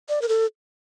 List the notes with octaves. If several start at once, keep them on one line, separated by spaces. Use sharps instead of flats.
D5
A#4
A4